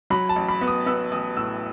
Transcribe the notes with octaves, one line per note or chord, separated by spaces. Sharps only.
F#3 B5
A5
A1
B5
B3
D#6
B3 E6
A1 D#6
A2 E6